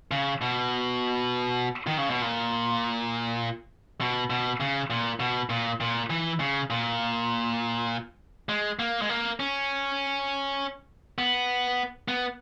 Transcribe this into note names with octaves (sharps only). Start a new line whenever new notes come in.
C#3
B2
D#3
C#3
B2
A#2
B2
B2
C#3
A#2
B2
A#2
A#2
E3
C#3
A#2
G#3
A#3
G#3
A#3
C#4
B3
B3